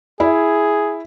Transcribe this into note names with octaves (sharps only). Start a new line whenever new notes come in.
E4 G#4